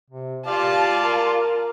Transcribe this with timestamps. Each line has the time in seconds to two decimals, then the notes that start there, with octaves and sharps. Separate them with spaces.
0.10 C3
0.47 F4 G4 D5 F5 A5
1.03 A#4